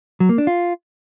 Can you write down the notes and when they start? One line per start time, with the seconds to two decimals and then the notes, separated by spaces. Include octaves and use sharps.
0.20 F#3
0.29 A#3
0.38 D4
0.47 F4